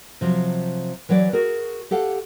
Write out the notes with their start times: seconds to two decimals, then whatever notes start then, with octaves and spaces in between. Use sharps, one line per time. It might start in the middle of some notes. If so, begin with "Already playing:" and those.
0.21 C3 F3 F#3
1.09 E3 F#3 B4 D5
1.33 F#4 G#4 A#4
1.91 G4 A4 F5 F#5